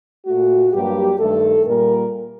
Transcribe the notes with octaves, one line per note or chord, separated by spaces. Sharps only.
A#2 A3 F#4
G2 F#3 A#3 G4
G2 D#3 A3 A4
A#2 G3 A#3 A#4